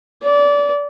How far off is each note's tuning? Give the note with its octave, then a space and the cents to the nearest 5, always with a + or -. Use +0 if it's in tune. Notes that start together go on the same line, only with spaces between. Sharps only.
D5 -25